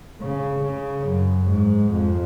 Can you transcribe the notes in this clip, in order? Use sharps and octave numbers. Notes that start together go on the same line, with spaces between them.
C#3
C#3
F#2
G#2
F2